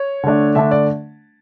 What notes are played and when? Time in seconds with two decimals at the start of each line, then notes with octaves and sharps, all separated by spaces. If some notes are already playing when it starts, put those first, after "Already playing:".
Already playing: C#5
0.23 D3 A3 D4
0.55 D3 A3 D4 E5
0.71 D5